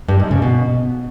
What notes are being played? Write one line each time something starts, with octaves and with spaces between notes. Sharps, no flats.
G2
G#2
C#3
B2